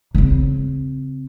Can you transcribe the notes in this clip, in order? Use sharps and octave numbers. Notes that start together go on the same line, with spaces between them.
C#3 C4